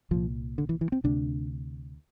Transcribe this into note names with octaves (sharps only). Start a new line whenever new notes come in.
C2 A#2 F3
D3
E3
E3
C4
D2 C3 D4